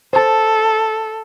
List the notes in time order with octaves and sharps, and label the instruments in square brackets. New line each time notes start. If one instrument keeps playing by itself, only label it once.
[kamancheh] A4 [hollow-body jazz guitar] C5 A5